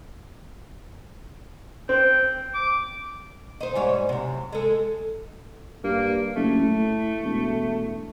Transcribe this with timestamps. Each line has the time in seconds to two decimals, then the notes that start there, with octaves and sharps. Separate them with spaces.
1.89 C4 G5
2.54 D6
3.61 D#4 C5
3.75 G#2 G3 C#5
4.09 F#2 C3
4.52 G#3 A4
5.84 G2 A#3
6.36 F#1 A3
6.61 A2
7.24 E1